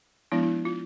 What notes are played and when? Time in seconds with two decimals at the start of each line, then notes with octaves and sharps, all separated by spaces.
0.32 F3 G#3 B3 D4 E4
0.43 E4
0.65 F4